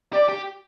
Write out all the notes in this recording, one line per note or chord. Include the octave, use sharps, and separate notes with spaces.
G4 D5
G4